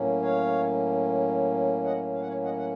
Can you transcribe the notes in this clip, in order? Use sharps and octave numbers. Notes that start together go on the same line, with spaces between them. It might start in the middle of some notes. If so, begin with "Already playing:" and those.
Already playing: A2 F#3 A#3 C#4
C#5 F5
D#5 F#5
F5
F#5
C#5 F5
D#5 F#5
F#5